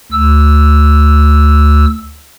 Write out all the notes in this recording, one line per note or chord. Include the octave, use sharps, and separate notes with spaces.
D2 E6